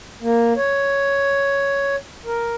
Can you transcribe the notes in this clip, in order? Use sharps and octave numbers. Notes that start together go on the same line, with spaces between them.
A#3
C#5
A#4